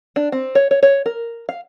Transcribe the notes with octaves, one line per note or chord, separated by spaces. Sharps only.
D4
C4
C#5
C#5
C#5
A#4
F5